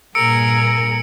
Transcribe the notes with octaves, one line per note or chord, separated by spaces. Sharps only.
G2 A#2 G#4 A#4 E6 C#7 D7